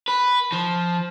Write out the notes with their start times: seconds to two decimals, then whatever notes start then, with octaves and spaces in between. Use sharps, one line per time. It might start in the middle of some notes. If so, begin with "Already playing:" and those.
0.08 B4
0.52 F3